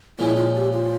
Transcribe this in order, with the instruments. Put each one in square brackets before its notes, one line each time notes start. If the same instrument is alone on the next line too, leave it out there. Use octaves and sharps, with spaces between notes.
[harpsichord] A#2 F3 G#3 C#4 [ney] E4
[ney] F4
G4
F4